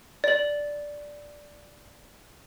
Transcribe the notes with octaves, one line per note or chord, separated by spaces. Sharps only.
D5 F#7